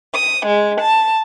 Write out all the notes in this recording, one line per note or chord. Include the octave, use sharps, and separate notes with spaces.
D#6
G#3
A5